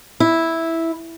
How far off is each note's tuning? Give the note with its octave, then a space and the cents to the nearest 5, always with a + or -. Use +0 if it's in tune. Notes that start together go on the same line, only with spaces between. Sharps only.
E4 -5